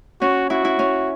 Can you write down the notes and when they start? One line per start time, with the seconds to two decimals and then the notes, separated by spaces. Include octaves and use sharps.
0.21 C#4 F#4
0.50 E4 F#4
0.65 E4
0.79 C#4